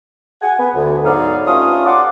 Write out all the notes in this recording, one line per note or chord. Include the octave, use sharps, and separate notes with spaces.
F#5 G#5
B3
D2
G#2 F#3 B3 D#4 D5 F5
G2 A3 C#4 F4 F5 D#6
D5 F5 F#5 C6 D6